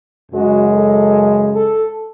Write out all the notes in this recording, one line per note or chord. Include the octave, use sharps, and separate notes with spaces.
F#2 C#3 G#3 F#4
A4
A4